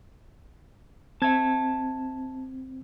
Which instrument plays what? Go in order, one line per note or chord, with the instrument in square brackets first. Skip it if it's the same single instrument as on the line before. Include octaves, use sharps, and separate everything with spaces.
[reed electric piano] C4 G#6 [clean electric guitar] E5 A5